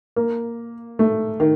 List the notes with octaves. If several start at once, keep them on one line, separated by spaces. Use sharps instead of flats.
A#3
A3
D#3